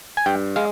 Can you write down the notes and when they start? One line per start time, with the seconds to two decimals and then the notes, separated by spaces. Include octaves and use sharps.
0.17 G#5
0.26 G2 G5
0.56 G#3 F5